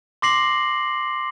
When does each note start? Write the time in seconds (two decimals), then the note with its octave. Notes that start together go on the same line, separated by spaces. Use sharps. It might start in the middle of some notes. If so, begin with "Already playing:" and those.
0.22 C6 D6 A#6 C7 F#7